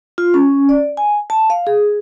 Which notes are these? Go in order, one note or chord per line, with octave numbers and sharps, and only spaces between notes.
F4
C#4
D5
G#5
A5
F5
G#4